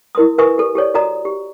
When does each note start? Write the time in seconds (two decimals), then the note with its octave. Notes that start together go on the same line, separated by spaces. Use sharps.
0.15 E4 A#4 C6 D#6
0.38 A#4 B4 E5 G#5 C#6 D#6
0.58 G4 A4
0.75 G4 A4 C#5 D5
0.94 F#4 A4 D5 D#5 A#5 D#6
1.25 G4